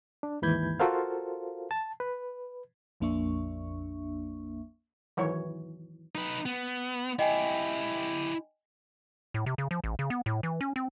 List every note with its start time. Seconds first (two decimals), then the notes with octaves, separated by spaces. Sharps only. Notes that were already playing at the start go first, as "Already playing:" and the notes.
0.23 D4
0.42 D#2 G#2 E3 B5 G6 G#6
0.80 F4 F#4 A4 A#4 C5 F5
1.71 A5
2.00 B4
3.00 A#1 F2 A#3 D4 E5 C#6
5.17 D#3 E3 F#3 C#5
6.15 D#4 B4
6.46 B3
7.19 E4 G4 D#5 G5 G#5
9.34 A2
9.46 C3
9.58 C#3
9.71 F3
9.84 A1
9.99 C#3
10.10 B3
10.26 A2
10.43 E3
10.61 C#4
10.76 C4